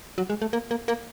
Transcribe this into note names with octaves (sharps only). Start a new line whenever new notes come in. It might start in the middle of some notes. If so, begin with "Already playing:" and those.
F#3
G#3
A3
A#3
A#3
A#3